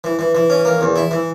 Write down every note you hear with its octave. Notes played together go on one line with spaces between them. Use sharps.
E3
E3
E3
C#4
A#3
E2
E4
E3